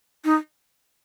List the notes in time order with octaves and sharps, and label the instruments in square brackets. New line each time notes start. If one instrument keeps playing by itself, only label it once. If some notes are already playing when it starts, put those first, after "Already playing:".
[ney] D#4